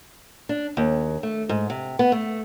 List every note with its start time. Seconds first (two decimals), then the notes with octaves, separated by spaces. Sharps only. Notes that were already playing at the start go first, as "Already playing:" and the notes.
0.49 D4
0.77 D#2
1.23 A3
1.49 G#2
1.70 C3
1.99 B3
2.12 A3